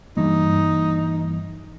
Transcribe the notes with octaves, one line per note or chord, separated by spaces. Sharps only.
G2 E3 A#3 D#4